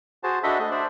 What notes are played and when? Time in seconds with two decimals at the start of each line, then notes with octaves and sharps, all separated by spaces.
0.23 F#4 G#4 C5 A5
0.43 D4 F#4 A4 D#5 E5 B5
0.59 A3 D#5
0.71 D4 C5 D5 E5